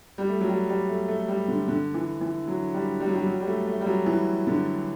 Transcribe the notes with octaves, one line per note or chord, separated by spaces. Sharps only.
G3
A3
F#3
G3
G3
A3
A3
G3
D3
D3
E3
E3
F#3
G3
G3
F#3
G3
F#3
G3
A3
A3
G3
F#3
E3
D3